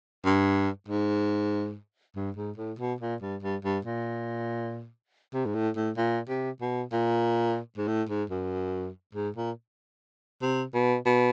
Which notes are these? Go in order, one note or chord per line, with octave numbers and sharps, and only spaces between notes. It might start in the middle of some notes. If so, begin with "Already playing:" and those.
G2
G#2
G2
G#2
A2
B2
A#2
G2
G2
G2
A#2
C3
G#2
A2
A2
A#2
C3
B2
A#2
G#2
A2
G#2
F#2
G#2
A#2
C3
B2
B2